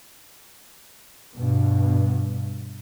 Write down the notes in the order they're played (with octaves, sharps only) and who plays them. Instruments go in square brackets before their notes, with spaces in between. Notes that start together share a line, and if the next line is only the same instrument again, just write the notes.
[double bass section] G2 B2